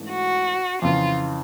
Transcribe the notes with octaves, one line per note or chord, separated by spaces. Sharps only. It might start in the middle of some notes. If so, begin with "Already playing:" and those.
Already playing: G#2 E3 A3 C#4
F#4
F2 C#3 E3 F4